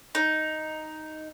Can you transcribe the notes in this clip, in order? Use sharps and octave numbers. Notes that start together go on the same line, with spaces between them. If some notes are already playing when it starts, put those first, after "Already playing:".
D#4